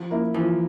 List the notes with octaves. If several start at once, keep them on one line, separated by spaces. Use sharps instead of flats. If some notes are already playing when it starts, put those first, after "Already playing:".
Already playing: F3
A#3 E4
E3 F3